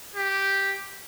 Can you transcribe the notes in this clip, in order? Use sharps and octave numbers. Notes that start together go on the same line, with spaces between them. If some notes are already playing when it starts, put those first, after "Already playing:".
G4